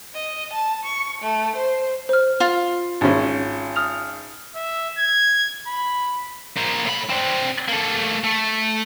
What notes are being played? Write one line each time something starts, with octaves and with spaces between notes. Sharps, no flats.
D#5
A5
C#6
A3
C5
C5 F6
F4
G#1 C#4
D#6 F6 F7
E5
G#6
B5
A#3 C5
A2 B5
C4 D4
A3 A#3
A3